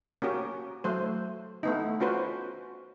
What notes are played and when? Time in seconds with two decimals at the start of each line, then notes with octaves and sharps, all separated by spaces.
0.22 A#3 C#4 F#4 G4
0.84 F#3 A3 C5
1.63 A3 B3 D#4
2.00 C#4 F4 F#4 B4 C5